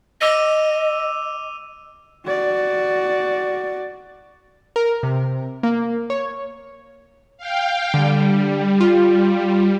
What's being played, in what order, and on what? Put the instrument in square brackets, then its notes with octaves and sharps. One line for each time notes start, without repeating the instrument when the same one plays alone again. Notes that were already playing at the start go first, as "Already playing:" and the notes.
[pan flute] D#5 [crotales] D6 E6 D#7
[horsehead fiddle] F#4 D5
[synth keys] A#4
C3
A#3
C#5
[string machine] F5 G5
[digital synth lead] D3 [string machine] G3
[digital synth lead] F4